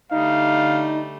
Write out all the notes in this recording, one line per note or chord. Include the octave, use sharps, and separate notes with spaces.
D3 G3 A3 D#4 F5